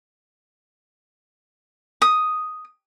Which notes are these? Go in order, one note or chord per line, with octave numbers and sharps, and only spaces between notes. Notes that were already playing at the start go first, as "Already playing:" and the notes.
D#6